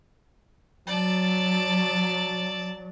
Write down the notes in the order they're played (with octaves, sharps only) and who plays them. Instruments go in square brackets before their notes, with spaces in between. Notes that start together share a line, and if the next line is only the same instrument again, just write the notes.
[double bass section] F#3 [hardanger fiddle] D5 A5